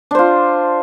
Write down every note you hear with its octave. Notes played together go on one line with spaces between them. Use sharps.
D4 F4 C5